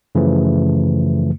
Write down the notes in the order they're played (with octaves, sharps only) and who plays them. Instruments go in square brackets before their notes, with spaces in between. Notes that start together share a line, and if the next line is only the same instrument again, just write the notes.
[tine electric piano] F#2 C#3 E3 F3 A3